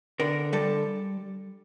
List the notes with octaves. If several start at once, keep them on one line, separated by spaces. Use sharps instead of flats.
D3 A#4
G3 A4